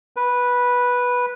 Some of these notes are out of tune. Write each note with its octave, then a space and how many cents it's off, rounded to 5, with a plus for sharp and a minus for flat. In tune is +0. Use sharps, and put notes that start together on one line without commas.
B4 -10